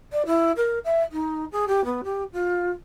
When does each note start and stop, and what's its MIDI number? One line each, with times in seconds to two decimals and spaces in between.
0.11 0.22 74
0.26 0.51 64
0.56 0.78 70
0.84 1.01 76
1.12 1.44 63
1.51 1.65 68
1.67 1.83 67
1.84 2.01 59
2.03 2.23 67
2.33 2.69 65